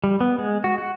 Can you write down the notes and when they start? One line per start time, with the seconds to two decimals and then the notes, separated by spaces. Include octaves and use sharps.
0.04 G3
0.21 B3
0.38 G#3
0.64 F#4
0.78 F#4